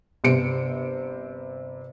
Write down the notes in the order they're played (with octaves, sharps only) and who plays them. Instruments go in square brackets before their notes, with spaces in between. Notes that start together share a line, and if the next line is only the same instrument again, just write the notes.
[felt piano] G1 C3 C5 C#7 D7